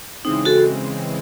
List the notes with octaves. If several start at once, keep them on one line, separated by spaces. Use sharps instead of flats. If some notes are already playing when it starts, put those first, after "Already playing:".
C#3 E3 G#3 C4 D#4
F#4 A4